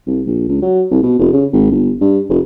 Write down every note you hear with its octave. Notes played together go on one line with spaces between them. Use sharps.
C2
A#1
C#2
F#3
C2
B2
F1
C#3
G#1
G1
G2
F1